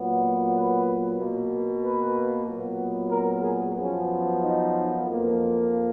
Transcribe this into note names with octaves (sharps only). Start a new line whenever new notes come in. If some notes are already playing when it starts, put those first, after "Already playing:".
Already playing: A#2 F#3 B3
B4
B2 A#3
B4
A#2 F#3 B3
A#4
G#4
F#2 F3 B3 C#4
D#4
F2 F3 A#3